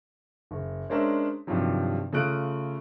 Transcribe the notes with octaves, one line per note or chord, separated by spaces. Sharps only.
F#1
G#3 C#4 D4 A#4 C5 E5
G2 C3 D#3 F3 F#3
C#3 A3 F4 D#6 F#6 D7